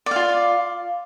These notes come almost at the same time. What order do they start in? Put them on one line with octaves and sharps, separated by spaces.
D5 F5 F4